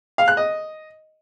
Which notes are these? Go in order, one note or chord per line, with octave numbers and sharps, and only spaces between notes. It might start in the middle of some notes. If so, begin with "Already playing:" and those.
F5
F#6
D#5